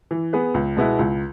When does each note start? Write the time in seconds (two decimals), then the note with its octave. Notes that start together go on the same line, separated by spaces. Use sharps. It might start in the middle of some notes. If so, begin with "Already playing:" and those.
0.11 E3
0.33 B3 G#4 B4
0.54 C#2
0.77 B2 G#3 B3 E4
0.99 C#2